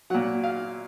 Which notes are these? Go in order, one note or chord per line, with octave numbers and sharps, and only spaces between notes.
A#2 F#3 F#5
F5